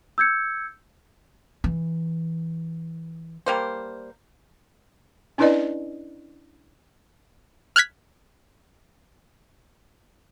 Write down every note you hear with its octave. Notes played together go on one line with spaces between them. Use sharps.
E6 G6 G#6 C#7
E3
G3 A#3 C5
C#4 D4 E4 B4 D5 D#5
F6 F#6 G#6 B6